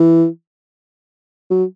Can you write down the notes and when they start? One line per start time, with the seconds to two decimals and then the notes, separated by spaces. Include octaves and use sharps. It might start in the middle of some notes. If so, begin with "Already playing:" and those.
Already playing: E3
1.50 F#3